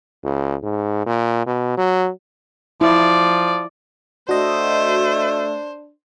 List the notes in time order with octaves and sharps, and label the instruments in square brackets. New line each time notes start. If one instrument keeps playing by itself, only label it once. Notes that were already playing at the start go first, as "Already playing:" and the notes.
[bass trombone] C#2
G#2
A#2
B2
F#3
[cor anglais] F3 [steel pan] E4 [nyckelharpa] D5
[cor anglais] A3 [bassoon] D4 [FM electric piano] F#4 D#5 [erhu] C5